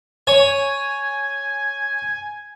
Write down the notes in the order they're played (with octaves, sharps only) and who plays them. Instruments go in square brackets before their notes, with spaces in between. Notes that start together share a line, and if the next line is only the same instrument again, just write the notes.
[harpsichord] C#5 [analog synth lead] G#5